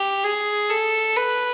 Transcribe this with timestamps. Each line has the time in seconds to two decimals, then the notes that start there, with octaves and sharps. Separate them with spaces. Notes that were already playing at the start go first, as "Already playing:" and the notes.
Already playing: G4
0.24 G#4
0.70 A4
1.17 B4